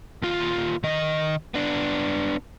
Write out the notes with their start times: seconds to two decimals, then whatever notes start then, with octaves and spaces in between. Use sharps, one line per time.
0.22 D#2 F4
0.83 D#3 D#5
1.54 B3 D4